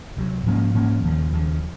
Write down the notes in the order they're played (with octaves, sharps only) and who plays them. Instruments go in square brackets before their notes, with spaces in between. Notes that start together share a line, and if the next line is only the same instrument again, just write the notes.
[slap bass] C#2 C3 F#3
G#2 F3 A#3 C#4
G#2 F3 A#3 C#4
D#2 C#3 F3
D#2 C#3 F3